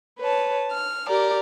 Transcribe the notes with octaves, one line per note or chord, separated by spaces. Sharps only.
B4 C#5 A5
F6
G4 A#4 D5